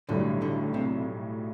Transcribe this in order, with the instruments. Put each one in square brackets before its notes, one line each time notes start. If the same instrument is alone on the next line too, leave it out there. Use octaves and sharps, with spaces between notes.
[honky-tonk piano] B1 A2 G3 [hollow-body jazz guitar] D3
[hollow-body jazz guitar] D3
C3